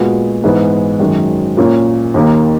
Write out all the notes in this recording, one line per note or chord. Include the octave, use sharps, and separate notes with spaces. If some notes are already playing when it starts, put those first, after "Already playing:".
Already playing: A#2 G#3 B3 F#4
G#2 E3 G#3 B3
F#2 D#3 G#3
A#2 A#3 C#4
D#2 D#3 A#3